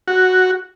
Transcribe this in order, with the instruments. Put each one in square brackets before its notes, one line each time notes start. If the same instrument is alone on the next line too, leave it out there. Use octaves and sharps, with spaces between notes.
[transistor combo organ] F#4